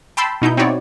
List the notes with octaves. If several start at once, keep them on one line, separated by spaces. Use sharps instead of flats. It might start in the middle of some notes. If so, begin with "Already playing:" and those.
G5 A5 B5 C6 E6 G6
B2 D#4 E4 G6
C4 D#4 E4 F#4 C#5 D5